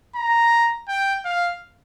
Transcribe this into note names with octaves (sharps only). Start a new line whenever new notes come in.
A#5
G5
F5